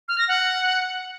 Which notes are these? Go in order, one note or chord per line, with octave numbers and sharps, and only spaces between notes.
F6
A#6
F#5